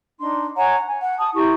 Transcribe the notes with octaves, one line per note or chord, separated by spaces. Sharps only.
D4 D#4 C6
C#5 F#5 G#5 A#5
G#5
F#5
A5 D#6
E4 G4 A#5 C#6